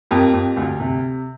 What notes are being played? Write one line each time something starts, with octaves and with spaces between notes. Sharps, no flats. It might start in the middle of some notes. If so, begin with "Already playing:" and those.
F2 G4 A#4
F2
D2
C3